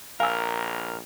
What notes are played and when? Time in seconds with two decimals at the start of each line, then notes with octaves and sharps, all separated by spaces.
0.20 A#1 A#4 F5 G#5 E6